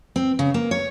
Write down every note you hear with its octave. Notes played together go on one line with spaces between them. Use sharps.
C4
C#3
A#3
C#5